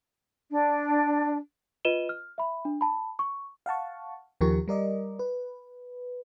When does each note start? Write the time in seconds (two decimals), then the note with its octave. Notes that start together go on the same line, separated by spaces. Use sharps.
0.51 D4
1.85 F4 B4 D#5 D#7 E7 G7
2.09 F6
2.38 E5 B5
2.65 D4
2.81 A5 B5
3.19 C#6
3.66 F5 F#5 A5 C#6
4.41 D#2 D#3 F3 G4 A#4 C#6
4.68 G3 A#4 D5 D#5
5.19 B4